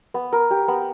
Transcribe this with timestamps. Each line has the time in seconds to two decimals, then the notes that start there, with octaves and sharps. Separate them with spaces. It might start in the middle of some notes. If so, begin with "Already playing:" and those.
0.14 B3
0.33 A#4
0.51 G4
0.68 B3